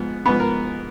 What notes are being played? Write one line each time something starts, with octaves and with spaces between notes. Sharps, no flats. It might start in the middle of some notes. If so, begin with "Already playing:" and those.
Already playing: G#2 F3 B3
G#2 F3 B3 B4
A#4